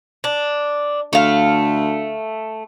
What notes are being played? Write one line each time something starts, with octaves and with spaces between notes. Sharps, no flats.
D4
D2 A3 F5